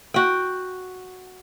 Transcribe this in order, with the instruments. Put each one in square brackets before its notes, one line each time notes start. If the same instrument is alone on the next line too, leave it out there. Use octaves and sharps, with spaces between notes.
[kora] F#4 G5